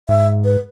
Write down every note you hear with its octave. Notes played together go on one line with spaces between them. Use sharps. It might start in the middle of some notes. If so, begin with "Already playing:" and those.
G#2 E5
B4